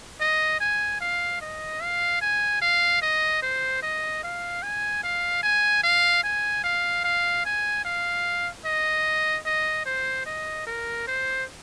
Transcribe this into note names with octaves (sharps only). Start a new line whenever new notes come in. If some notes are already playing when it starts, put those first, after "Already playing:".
D#5
G#5
F5
D#5
F5
G#5
F5
D#5
C5
D#5
F5
G#5
F5
G#5
F5
G#5
F5
F5
G#5
F5
D#5
D#5
C5
D#5
A#4
C5